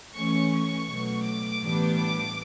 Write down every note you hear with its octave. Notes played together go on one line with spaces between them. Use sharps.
E3 A3 C#4 C#6
C#6
B2 F#3 A3
D6
A2 E3 G3 B3 D4
D6